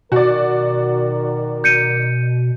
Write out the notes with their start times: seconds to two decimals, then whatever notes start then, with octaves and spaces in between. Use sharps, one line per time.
0.12 B2 D#3 F#4 A#4 D5
1.64 G6 C#7 D#7